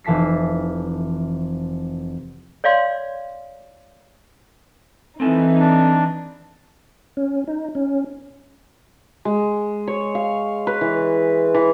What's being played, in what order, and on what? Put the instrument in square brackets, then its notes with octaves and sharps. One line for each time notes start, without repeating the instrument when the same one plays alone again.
[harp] F1 E3 A5 B6 C7
[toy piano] C#5 D5 F5 C6
[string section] E3 D#4 [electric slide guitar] C4 A4 G#5
[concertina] D4
[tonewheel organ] C#4
D#4
C#4
[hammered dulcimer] G#3
C#5
F5
B4
E3
E3